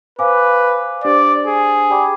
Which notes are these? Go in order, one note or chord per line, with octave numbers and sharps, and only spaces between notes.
B4 C5 F5 G#5 D6
D4 G4 C5 D5
G#4
G4 D5 G5 B5 D6